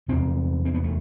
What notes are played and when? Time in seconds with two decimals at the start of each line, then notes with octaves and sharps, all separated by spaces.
0.08 E2 C3 C4
0.65 C4
0.74 B3
0.84 A3